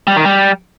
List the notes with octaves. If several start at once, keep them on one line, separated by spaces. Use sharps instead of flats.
G3
D#3
G3